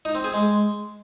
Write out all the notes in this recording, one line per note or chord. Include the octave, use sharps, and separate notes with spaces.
D#4
C4
G#4
G#3